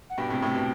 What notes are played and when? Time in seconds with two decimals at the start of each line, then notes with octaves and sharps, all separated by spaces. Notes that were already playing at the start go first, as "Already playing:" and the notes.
0.10 F#5
0.18 G2 B2 G5
0.30 A2 C3
0.42 A2 C3
0.55 B2